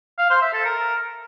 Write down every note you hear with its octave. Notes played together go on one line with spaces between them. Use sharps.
F5
C5
E5
A4
A#4